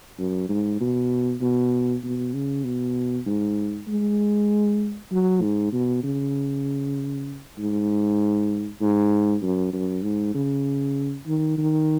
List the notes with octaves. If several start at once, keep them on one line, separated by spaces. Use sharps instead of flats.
F#2
G#2
B2
B2
B2
C#3
B2
G#2
G#3
F#3
G#2
B2
C#3
G#2
G#2
F#2
F#2
G#2
C#3
D#3
D#3